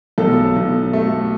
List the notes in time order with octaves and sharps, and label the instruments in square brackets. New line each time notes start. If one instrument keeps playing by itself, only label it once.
[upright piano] B1 A4
B1
A3